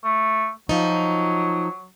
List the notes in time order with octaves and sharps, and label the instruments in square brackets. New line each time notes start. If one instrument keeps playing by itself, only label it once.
[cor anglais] A3
[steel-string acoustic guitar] F3 D#4 [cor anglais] F#3